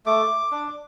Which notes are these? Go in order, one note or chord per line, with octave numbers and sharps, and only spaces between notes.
A3 D6
D4